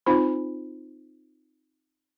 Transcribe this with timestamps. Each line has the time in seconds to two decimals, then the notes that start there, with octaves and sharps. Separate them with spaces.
0.06 C4 D#4 F4 C5 B5